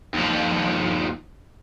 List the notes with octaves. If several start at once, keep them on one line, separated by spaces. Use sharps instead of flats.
D#2 F3